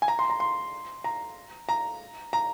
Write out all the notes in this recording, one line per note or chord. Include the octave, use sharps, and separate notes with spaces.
G#5
A#5
C6
A#5
C6
A#5
A#5
A#5